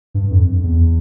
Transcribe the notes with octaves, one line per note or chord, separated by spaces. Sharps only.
G2
F2
E2